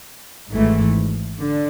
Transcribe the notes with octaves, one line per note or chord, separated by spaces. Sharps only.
G#1 G#2 E3 A3
D3